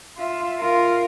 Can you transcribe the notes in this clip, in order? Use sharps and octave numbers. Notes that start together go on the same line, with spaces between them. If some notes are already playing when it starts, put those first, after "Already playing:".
F4 E5
F4 A#4